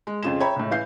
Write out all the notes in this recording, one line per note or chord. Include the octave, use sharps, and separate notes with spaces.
G#3
F2 C#3 F4 G#4 E7
C#5 E5 G5 A#5 B5
C#2 A2
E3 F5 G6 C7